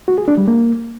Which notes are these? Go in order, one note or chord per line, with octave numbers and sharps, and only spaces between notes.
F#4
G#4
D4
G3
A#3